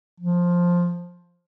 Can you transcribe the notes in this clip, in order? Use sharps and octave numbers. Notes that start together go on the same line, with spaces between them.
F3